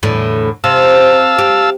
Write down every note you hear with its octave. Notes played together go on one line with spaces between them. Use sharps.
E2 A2 D3
C3 F5 A5 E6
G4